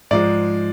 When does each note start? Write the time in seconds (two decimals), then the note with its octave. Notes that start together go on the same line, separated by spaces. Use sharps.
0.11 G#2 F3 G#3 D5